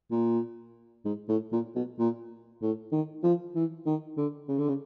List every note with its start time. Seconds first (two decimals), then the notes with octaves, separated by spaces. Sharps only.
0.11 A#2
1.05 G#2
1.29 A2
1.52 A#2
1.76 B2
1.99 A#2
2.62 A2
2.92 D#3
3.23 F3
3.55 E3
3.86 D#3
4.17 D3
4.49 C#3
4.59 D3
4.69 C#3